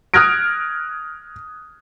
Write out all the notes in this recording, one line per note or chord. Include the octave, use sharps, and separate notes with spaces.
D#6 F6 F#6 G#6 A#6 D7